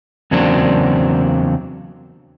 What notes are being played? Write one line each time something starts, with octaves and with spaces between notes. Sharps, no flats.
E2 C#3 F#3 A#3 C4 D4